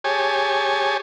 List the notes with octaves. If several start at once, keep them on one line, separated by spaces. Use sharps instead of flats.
G4 G#4 C#5 G#5 A5